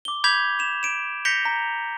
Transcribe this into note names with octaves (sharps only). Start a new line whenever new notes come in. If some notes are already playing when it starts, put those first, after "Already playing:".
D6 G7
B5 D6 G6 G#6 B6 F7
E7 F7
D7 E7
G6 A#6 B6 C#7 F7 G7
A#5